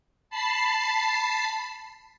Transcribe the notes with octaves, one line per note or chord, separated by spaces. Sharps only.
A5 B5 C7